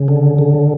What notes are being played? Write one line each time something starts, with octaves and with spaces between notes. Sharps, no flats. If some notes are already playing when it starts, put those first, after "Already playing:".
Already playing: C#3
D3
D3